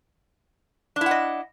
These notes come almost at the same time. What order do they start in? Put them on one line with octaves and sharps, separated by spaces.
D4 E4 F#5 D#5